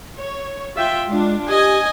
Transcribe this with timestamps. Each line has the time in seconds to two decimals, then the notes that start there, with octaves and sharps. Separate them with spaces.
0.19 C#5
0.75 F4 E5 G5
1.08 G#3 D4 F4
1.49 G4 D#5 G#5